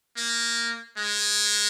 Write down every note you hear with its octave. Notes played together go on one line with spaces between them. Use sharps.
A#3
G#3